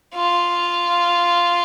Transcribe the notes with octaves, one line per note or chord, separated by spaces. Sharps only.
F4